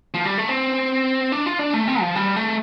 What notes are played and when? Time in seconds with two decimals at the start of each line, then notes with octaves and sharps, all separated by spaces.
0.14 F3
0.25 G3
0.38 A3
0.49 C4
1.32 D4
1.46 F4
1.59 D4
1.74 A3
1.87 C4
2.01 F3
2.15 G3
2.36 A3